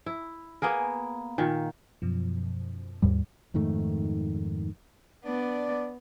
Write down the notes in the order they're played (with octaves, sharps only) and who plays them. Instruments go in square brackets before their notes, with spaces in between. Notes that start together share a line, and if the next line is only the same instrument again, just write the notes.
[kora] E4
A#3 B3 G#4 A#4
A#2 D#3
[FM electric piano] F#2 B2 F3
[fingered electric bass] D#2 G#2 G3
F2 G#2 D#3 A3
[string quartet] B3 [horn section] D4 D5